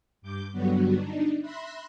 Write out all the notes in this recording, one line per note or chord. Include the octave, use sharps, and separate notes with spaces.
G2 D6 G6
G2 D3 F#3 G3 B3 F#4
D4 D#4
E5 B5 C6 F#6 A#6